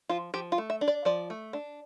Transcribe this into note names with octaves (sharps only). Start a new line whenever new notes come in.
F3 F4
F3 G4
F4
A3
E5
D4
D5
F3 D5
A3
D4